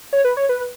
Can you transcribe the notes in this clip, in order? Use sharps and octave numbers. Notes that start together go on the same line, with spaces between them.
C#5
B4
C#5
B4